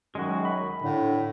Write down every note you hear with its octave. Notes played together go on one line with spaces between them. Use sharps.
F#2 D#3 G#3 F#4
B5
A2 D3